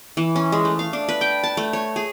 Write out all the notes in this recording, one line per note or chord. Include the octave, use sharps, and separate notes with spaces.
E3
C#4
G#3
A3
F5
D4
B4
G5
A5
A3
C#5
G#4